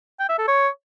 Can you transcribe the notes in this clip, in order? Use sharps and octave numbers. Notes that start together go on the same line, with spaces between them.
G5
E5
A4
C#5